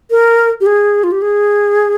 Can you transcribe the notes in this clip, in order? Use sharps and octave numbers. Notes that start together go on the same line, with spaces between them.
A#4
G4
G#4
F4
G4
G#4